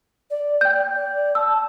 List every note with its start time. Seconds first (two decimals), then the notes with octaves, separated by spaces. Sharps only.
0.30 D5
0.61 G5 G6
0.94 D5
1.35 A5 E6